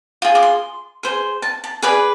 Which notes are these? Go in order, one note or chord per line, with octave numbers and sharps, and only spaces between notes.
F4 G#4
D6
C6
G#4 C5
A5
A5
G#4 B4 D5 G#5